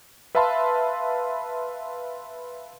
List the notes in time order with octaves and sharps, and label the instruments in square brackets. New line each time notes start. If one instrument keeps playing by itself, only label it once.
[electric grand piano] B4 E5 F5 A5 B5 C6